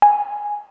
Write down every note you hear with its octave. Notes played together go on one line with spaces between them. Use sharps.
G#5